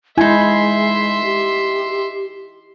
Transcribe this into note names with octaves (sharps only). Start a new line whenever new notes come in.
G#3 D#4 E4 E5 G#5 C6
G4